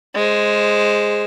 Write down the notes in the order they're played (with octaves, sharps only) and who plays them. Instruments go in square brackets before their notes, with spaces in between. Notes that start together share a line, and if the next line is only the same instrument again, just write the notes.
[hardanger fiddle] G#3 C5